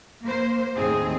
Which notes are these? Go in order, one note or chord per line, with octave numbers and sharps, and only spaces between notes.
A#3 C5
D#2 A2 C4 G#4